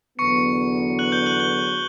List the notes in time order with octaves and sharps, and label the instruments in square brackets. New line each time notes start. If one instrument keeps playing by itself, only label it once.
[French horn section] E2 D3 F#3 B3 [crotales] C#6 C#7
[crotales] F#6 F#7
G6 G7
F#6 F#7
G6 G7